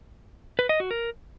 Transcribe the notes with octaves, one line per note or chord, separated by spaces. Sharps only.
B4
D#5
F#4
A#4